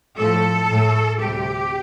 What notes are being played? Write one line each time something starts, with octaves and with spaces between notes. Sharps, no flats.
A2 F3 A3 A4
A2 A3
D2 C3 G3 G4